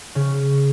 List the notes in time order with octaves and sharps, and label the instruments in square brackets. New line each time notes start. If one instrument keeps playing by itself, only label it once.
[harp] C#3